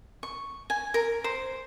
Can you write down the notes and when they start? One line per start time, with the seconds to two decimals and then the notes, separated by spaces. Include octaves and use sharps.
0.23 C#6
0.70 G#5
0.94 A#4
1.24 C5